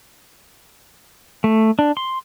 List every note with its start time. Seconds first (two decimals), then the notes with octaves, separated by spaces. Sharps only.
1.44 A3
1.79 D4
1.97 C6